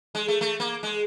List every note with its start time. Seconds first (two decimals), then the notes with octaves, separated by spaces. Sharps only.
0.15 G#3
0.28 A3
0.41 A3
0.60 A#3
0.83 G#3